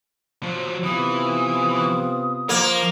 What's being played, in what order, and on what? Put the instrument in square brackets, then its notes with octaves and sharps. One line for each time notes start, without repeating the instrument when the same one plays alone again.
[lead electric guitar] F3 F#3
[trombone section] C3 B3 F4 [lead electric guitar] E3 [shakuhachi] D#6
[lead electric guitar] F3 [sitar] A#3